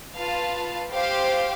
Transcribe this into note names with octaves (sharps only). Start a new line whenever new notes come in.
F4 B4 F5 A5
G4 C5 F5